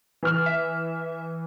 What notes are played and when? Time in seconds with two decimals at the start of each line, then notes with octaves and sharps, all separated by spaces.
0.23 E3 F6
0.46 E5